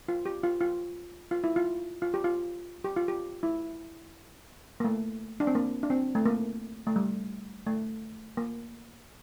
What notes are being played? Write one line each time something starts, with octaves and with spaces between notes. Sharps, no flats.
F4
G4
F4
F4
F4
E4
F4
F4
G4
F4
G4
F4
G4
E4
A#3
A3
D4
C4
A#3
D4
C4
A3
A#3
A3
G3
A3
A#3